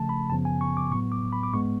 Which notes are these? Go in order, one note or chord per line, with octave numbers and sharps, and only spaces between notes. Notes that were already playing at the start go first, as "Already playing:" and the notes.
Already playing: C#3 F3 A3 A5
B5
F#2 C#3 F3 B3 A5
G#5
C#6
D6
A2 F#3 B3 C#6
D6
B5
D6
G#2 G#3 B3 C#6